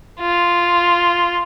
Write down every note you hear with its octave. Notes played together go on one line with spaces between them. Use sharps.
F4